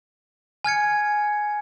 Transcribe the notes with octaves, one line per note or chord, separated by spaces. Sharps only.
G#5 F6 G#6 C#7